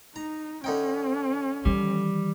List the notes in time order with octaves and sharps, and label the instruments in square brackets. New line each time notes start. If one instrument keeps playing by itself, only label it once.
[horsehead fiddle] D#4 [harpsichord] A#5
[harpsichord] D3 D#4 G5 [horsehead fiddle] C#4
[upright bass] D#3 E3 [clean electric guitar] G3